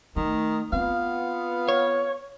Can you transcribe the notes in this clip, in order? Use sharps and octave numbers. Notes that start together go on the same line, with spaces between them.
D#3 A3
B3 C4 F4 F5
C#5